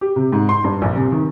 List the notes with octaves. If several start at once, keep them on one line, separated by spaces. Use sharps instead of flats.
G4
C3
G#2
C6
G2
A#1
C3
D#3